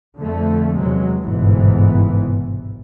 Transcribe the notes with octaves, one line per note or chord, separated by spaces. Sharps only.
F2 D3 A3
E2 C3 F#3 G#3
G1 C2 G#2 B2 E3 B3